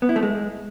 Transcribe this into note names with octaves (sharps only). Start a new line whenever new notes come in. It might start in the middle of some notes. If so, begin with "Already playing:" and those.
B3
E4
A3
G#3